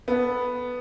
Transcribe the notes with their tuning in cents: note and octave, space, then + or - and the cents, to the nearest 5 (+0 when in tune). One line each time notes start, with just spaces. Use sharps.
B3 +0 A4 +0